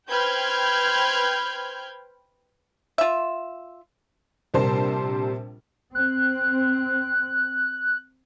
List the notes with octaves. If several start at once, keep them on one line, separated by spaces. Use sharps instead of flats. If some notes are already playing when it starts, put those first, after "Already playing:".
B4 C5 G5 F6 G6 G#6
F4 E5
A#1 C3 G3 A#4 C5 A5
C4 F#6